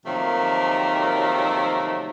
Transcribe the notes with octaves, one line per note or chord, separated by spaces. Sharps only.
C3 D#3 F3 F#3 A3 A#3